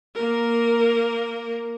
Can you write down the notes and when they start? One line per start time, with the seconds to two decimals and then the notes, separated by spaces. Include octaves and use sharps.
0.15 A#3 A#4